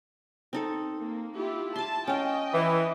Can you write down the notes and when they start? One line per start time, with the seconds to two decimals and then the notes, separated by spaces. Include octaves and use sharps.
0.53 C4 D#4 A4
0.98 A#3
1.36 E4 F4 G4
1.76 A5 C6 D6
2.07 C#4 D#5 F5 G5
2.54 E3